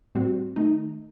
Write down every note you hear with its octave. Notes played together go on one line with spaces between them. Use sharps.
A2 G3 C4 F#4
D#3 A3 D#4